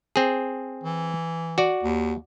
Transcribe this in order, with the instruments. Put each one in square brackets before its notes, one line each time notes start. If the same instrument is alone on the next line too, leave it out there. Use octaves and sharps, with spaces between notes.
[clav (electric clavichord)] C4 G#4
[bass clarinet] E3
[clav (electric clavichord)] F#4 D5
[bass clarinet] D#2